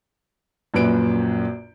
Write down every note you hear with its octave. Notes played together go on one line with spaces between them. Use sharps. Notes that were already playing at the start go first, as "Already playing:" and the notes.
A#1 F#2 A#2 B4 D7